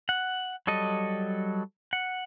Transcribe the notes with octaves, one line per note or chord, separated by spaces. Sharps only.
F#5
F#3 G3 A4 D#5
F#5